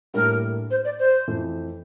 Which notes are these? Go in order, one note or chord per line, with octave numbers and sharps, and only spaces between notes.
A2 G3 A#3 D4 A#4
C5
D5
C5
F2 E3 A3